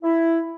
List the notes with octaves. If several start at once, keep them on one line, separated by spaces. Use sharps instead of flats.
E4